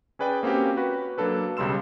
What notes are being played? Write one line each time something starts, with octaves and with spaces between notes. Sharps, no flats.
C#4 G#4 B4 D5 G5
A#3 C4 C#4 F#4 G4
F#4 B4
F#3 A#3 D4 A4 B4
B1 C#3 G3 C6 E6 E7